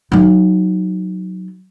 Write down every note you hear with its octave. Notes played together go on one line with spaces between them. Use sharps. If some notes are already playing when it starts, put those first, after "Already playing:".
F#3 D#4